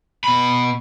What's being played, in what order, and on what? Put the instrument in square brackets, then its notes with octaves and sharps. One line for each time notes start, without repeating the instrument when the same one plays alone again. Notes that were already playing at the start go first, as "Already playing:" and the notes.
[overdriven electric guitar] B2 B5